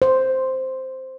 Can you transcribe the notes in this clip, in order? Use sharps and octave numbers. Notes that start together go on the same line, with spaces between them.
C5